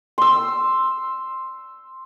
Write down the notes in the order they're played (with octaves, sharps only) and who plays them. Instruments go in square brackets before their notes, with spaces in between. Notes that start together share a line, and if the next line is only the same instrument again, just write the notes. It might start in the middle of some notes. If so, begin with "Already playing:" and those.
[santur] C6 E6